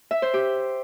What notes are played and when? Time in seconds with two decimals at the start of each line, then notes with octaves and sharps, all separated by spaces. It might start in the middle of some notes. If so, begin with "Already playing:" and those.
0.11 E5
0.22 C5
0.34 G4